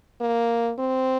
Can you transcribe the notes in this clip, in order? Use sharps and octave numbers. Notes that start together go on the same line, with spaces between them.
A#3
C4